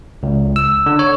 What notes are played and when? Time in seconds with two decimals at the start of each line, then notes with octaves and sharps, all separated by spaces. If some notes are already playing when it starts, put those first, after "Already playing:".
0.23 C#2
0.56 E6
0.86 D3
0.99 C#5